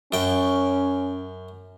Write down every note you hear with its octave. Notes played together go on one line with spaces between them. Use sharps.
F#2 C#4 G5